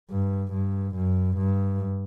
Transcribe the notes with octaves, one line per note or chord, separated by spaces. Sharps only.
G2
G2
F#2
G2